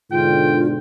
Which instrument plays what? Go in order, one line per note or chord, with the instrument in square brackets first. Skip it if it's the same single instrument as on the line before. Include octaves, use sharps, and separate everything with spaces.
[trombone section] G#2 B2 D3 [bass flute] F4 [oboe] G5